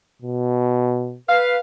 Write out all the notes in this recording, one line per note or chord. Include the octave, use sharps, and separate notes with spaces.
B2
B4 F5